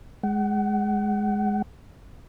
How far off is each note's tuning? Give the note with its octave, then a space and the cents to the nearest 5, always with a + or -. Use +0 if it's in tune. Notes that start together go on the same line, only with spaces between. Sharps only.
G#3 +0 F#5 +30